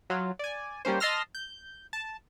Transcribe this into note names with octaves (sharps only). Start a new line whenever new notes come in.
F#3 F4
D5 G#5
G3 A#3 C#4 C5
D#5 A5 C6 E6 F6 A#6
G6
A5